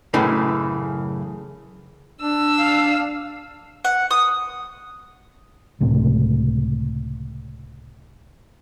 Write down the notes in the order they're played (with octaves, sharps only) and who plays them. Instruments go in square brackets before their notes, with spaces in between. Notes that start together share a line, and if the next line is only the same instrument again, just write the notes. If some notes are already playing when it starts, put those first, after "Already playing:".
[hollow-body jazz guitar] F#2 A2 C#3 E3
[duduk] D4 [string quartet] E6
[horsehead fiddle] F5
[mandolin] F#5
D#6
[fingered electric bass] C#2 A2 C3